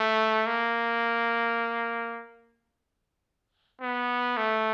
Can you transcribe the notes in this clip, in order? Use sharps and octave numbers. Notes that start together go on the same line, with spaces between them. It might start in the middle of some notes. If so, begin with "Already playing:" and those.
Already playing: A3
A#3
B3
A3